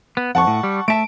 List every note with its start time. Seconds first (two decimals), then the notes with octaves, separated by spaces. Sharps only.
0.17 B3
0.35 F2 F#5 A5 C#6
0.47 A2
0.63 G3
0.88 A3 E5 A5 D7